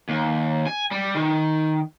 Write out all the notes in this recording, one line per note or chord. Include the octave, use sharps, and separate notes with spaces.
D#2
G#5
G3
D#3